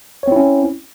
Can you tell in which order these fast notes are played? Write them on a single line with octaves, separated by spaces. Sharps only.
C#5 C4 E4 C#4